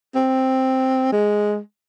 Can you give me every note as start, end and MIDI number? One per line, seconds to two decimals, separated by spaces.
0.15 1.09 60
1.12 1.59 56